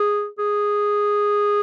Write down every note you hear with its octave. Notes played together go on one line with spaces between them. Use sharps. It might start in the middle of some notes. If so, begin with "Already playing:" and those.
Already playing: G#4
G#4